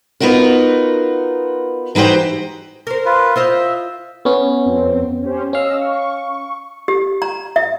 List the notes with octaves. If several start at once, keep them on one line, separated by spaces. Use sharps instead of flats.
B3 D#4 F4 F#4 A#4
E3 D#4 F#4 G4 C5
A#4 C5
F4 B4
F4 C5 D#5 E5
B3 C#4
F2 C4
C#4 G4 C5
C#4 D#5 F5 E6
C#6
G4
A#5
E5